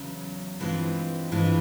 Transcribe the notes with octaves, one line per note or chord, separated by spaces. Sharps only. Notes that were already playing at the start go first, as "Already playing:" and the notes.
Already playing: E2 C#3 F#3
G2 E3 G#3 C4 F4
G2 E3 G#3 C4 F4